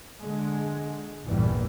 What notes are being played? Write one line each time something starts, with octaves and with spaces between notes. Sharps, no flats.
D3 G#3
A1 E2 G2 A#2 E3 G3